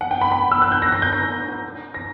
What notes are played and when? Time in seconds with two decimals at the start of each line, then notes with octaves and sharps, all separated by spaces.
0.01 F#5
0.11 G5
0.21 B5
0.32 B5
0.52 E6
0.62 F#6
0.72 G6
0.82 A#6
0.92 A#6
1.02 G6
1.13 A#6
1.94 A#6